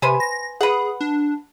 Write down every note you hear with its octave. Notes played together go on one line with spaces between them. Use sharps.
C3 B4 C5 G#5
A#6
G#4 B4 F#5
D4